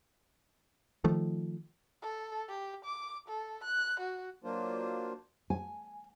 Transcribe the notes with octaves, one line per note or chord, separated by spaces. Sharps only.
D#3 F3 A3
A4
G4
D6
A4
F#6
F#4
F#3 A#3 D4 F4 C5
G#5